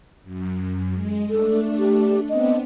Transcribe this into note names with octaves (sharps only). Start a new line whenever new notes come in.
F#2
G#3
A3 D4 A4
G4
B3 C4 D4 D#5